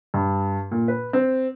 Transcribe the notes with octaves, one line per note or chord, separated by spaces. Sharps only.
G2
A#2
B4
C4